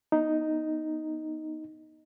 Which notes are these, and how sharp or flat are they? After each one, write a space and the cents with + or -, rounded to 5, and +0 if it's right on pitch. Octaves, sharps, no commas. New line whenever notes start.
B3 -30 D#4 +0